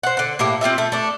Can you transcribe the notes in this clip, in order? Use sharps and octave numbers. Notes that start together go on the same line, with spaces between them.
C5 F#5
D3 F#5
A2 A#3 E4 G4
C4 F4 G4 E5
A3
A3 D4